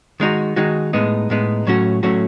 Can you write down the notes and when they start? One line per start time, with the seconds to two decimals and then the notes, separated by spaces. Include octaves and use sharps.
0.20 D#3 G#3 D#4 F#4
0.56 D#3 G#3 D#4 F#4
0.93 A2 G#3 B3 D#4
1.30 A2 G#3 B3 D#4
1.67 A2 F#3 A3 C#4 F#4
2.03 A2 F#3 A3 C#4 F#4